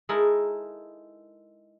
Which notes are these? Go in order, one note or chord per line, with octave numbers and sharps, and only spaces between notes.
G#3 D#4 E4 A4 A#4